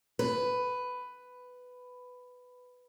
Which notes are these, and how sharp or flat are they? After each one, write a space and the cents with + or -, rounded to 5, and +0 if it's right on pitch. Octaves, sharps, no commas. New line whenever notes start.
B4 +10